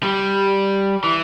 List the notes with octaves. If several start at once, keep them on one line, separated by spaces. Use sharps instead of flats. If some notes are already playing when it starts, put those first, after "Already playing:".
G3
E3